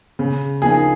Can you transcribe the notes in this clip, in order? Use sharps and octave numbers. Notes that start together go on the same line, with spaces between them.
C#3
F3 A#3 D#4 G#4